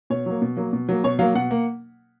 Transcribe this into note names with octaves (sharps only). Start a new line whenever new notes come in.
B2 C#5
F#3 A#3
B2
F#3 A#3
B2
F#3 A#3
B2 C#5
F#3 A#3 F5
B2 F#5
A#3